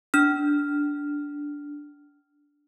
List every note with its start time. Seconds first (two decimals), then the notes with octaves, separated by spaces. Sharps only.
0.14 D4 F6